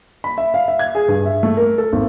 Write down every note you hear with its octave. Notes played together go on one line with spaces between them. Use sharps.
B5
E5
F5
E5
G#6
G#4
G2
E5
A3
A#4
A4
G#1